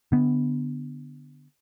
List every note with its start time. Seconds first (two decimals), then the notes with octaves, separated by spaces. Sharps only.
0.12 D3 B3